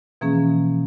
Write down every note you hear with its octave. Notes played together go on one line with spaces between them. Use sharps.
B2 E3 F3 A#3 C#4 G#4